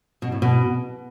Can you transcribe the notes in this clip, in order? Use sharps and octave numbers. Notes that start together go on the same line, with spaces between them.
B2
A2
B2